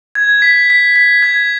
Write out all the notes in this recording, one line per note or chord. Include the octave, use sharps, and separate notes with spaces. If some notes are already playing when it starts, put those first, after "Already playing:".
G#6
B6
B6
B6
G#6